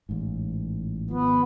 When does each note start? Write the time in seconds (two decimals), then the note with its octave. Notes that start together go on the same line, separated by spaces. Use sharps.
0.09 A1 G#2
1.11 G#1 F3 B3